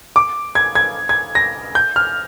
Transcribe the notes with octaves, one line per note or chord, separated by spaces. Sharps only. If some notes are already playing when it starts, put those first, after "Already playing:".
D6
G#6
G#6
G#6
A#6
G6
F6